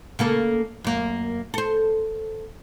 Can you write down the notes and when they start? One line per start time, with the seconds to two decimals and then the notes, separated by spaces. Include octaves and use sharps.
0.19 C#3 A#3 A4
0.84 F#2 A#3
1.54 A4 C5